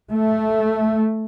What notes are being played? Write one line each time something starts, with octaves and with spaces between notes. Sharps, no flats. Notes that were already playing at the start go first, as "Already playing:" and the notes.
A3